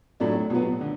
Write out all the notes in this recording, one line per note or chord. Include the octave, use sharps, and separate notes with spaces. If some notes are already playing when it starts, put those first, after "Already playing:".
A2 F#3 A3 D4
B2 F#3 B3
D3